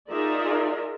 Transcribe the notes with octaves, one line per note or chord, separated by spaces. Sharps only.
D#4 F4 G#4 A#4 D5 E5